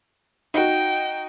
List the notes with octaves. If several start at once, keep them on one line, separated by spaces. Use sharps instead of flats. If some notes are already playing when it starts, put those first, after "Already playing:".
D#4 F#4 G5